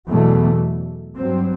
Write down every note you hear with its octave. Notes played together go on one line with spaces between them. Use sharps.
E2 B2 F#3 A3
G2 F#3 C4